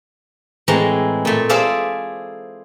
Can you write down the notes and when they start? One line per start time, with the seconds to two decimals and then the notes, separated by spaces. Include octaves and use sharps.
0.68 A2 E3 G#3 C4 A#5
1.25 A#2 A3
1.49 G#4 A4 C5 D5 E5 F5